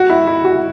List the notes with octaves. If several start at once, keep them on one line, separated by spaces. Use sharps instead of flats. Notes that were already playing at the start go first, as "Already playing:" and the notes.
Already playing: F#4
E4
E4
F#4